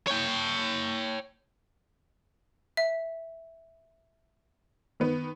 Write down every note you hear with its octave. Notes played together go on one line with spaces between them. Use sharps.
C#5 G5
E5
D#3 B3